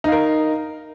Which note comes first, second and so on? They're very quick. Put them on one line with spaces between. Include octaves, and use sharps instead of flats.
D#4 F5 A#4